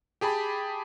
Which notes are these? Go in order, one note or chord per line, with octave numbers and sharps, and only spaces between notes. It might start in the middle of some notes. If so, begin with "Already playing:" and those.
G4 G#4 A5 B5